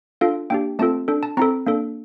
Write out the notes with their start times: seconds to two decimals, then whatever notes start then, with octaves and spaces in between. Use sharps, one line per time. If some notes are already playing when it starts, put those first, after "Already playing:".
0.21 D4 F4 A4 F5
0.50 A#3 D4 G4 G5
0.79 A3 C4 F4 A4 A5
1.08 D4 A4
1.23 A5
1.37 C4 E4 A4 A#5
1.66 A#3 D4 A4